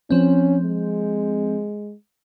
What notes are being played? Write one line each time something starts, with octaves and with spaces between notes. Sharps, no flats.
F3 C4 C#4
G#3